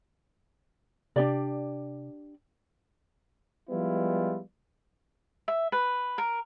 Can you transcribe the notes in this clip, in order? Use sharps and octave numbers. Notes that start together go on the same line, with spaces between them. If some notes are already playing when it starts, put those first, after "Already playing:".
C3 D4 G4 D5
F3 G3 G#3 B3 E4 F4
E5
B4
A#4